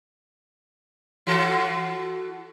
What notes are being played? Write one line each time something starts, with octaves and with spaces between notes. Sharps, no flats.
E3 F#4 A4